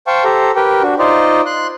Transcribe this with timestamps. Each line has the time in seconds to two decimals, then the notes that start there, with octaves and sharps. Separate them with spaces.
0.07 C5 F5 G5 A5 C#6
0.24 G4 A4 C5 A#5
0.56 G4 A#4 B4 G5
0.82 D4 F#4
0.99 D#4 F4 C5 D5 D#5
1.46 C6 F#6